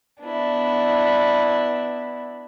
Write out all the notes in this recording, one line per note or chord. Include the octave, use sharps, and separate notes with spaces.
B3 D4 E4